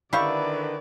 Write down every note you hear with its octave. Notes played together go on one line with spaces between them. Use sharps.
D3 D#3 E4 G4 B4 D5 F5 C#6